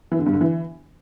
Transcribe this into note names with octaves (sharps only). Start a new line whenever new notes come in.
E3
D3
G2
D3
E3